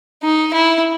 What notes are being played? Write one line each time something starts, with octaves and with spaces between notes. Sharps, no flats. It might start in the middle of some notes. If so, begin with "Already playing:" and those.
D#4
E4